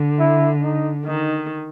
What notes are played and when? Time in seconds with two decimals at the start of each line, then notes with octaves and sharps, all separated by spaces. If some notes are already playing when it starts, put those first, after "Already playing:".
Already playing: D3
0.19 E4
0.62 D#4
1.05 D#3 D#4